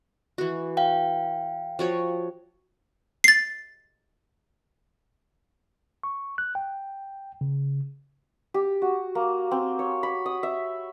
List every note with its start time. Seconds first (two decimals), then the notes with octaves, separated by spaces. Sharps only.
0.38 E3 F#4
0.77 F5 G5
1.79 F3 F#4 C#5
3.24 A6 C7
6.03 C#6
6.38 F#6
6.55 G5
7.41 C#3
8.54 G4
8.82 F#4
9.15 A#3
9.51 C4
9.79 C#5
10.03 B5
10.26 D#6
10.43 E5